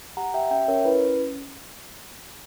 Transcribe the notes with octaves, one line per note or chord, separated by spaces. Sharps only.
G4 F#5 A#5
G4 E5 G5
C#4 E5 G5
C#4 A#4 C#5
E4 B4
C#4